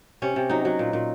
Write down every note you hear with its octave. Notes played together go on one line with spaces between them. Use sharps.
C3 C#4
C3
F#3 D#4
F#3
A#2
A#2